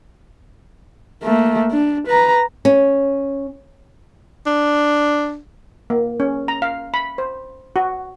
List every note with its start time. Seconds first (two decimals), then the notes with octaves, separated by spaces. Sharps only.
1.23 A3 A#3
1.72 D4
2.08 B4 A#5
2.65 C#4
4.47 D4
5.90 A#3
6.20 C#4
6.48 A#5
6.62 F5
6.94 B5
7.18 C5
7.76 F#4